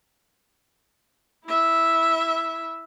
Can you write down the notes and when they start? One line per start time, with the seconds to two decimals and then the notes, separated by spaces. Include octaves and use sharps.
1.45 E4 E5